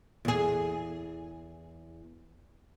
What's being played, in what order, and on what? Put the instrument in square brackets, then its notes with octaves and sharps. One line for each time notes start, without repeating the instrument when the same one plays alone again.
[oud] E2 G#4